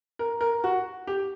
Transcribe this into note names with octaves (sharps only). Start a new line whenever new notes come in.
A#4
A#4
F#4
G4